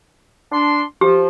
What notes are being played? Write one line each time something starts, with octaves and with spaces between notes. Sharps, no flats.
D4 C6
F3 G4